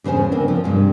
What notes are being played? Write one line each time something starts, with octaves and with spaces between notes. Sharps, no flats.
E2 C#3 C#4 C5 G#5
D3 C4 A#4
F3
G2 C3